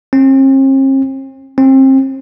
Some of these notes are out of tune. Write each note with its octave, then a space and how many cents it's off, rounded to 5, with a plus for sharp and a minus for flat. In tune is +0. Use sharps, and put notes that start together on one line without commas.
C4 +45
C4 +30